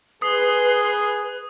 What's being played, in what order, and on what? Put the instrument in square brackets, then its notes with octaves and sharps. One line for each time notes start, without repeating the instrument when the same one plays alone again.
[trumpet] G#4 [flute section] B4 [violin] C6 C7 [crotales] D#6